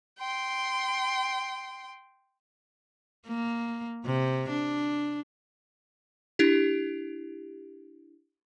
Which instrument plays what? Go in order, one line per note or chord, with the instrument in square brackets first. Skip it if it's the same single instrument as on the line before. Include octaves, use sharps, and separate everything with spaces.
[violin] G5 C6
[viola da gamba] A#3
C3
D4
[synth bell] D4 E4 G4